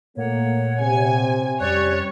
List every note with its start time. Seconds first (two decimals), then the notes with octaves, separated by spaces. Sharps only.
0.17 A#2 A3 A#3 C#5 F#5
0.80 C3 G#5
1.60 F2 G3 C#4 C#5 D5 F#6